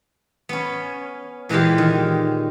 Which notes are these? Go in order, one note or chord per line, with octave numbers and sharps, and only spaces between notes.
B3 C#4
A#2 E3 G#3 G4 F5
D#3